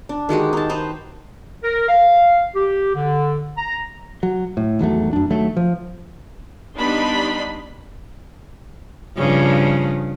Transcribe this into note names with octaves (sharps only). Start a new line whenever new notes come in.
D4
D#3 G#3 F#4 G4
D#4 A5
D#4 B4 C5
A#4
F5
G4
D3
A#5
F#3
A2
G#1 E2 F#3 A3
F#2 D4
D#2 F#3 A3
F3
G3 B3 D4 D#4 B5 C6
G2 C#3 F3